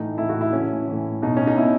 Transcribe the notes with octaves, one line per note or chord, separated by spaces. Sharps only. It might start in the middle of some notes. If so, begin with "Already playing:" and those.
Already playing: A2 E3 D#4
A2 E3 E4
F#4
E4
A2 E3 C#4
A2 E3
B2 D#4
C#4
D#4
B2 E4